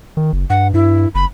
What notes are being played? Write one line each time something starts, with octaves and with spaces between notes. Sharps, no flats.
D#3
F#1
G2 F#5
G2 E4
F#1 B5